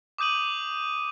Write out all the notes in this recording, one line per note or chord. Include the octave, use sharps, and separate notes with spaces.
D6 D#6 G6 D#7 F#7